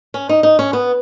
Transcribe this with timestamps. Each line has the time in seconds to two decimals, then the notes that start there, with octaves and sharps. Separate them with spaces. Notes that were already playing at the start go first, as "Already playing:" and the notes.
0.14 C#4
0.29 D#4
0.43 D#4
0.59 C#4
0.73 B3